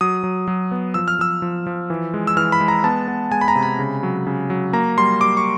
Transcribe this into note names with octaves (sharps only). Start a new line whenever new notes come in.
F#3 D#6
F#3
F#3
B3
F3 E6
F6
F3 E6
F3
F3
E3
G#3
E6
E3 F6
B5
G#3
A#5
B3 A5
B3
G#3 G#5
B5
A#5
C3
B5
C#3
F#3
C#3
F#3
A#3 A#5
G3 C6
G3 D6
C#6